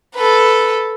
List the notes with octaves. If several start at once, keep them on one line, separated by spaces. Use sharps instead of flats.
A4 B4